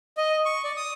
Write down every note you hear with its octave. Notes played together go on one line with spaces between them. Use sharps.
D#5
C#6
D5
D#6